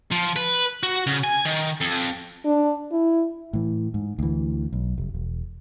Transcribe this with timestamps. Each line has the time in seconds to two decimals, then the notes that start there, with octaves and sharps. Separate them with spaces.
0.12 F3
0.36 B4
0.83 F#4
1.07 C#3
1.24 G#5
1.45 D#3
1.81 F2
2.45 D4
2.92 E4
3.53 A2 E3
3.94 G#2
4.19 D2 E3
4.73 B1
4.98 F1
5.14 E1